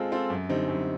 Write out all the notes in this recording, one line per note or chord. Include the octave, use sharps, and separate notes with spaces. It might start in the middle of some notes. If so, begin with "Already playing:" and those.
Already playing: G#3 C4 F4 A4
C4 F4 A4
F#2
D3 G3 C4 D#4
F#2